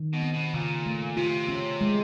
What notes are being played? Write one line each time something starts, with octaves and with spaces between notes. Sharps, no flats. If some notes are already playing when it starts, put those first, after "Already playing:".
Already playing: D#3
B2
C4
B2
A#2 C#3
A3
C3 F4
C#4
G#3